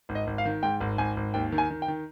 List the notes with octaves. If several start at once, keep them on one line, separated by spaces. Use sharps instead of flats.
G#1
D#5
G#1
F5
D#3
G#2 G5
G#1
G#1 G#5
G#1
D#2 G5
D#3
G#5
D#3
G5
D#3